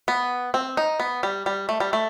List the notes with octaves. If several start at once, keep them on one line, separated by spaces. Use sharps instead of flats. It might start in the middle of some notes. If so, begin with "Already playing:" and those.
B3
C4
D#4
B3
G3
G3
A3
G3
A3